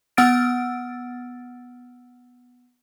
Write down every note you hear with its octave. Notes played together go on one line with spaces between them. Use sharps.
B3 F#5 E6 F6 A6 D7